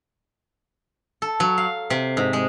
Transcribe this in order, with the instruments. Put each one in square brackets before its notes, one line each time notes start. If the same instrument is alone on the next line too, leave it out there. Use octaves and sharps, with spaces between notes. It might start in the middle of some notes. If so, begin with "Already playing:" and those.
[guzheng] A4
F#3
F5
C3
G#2
G#3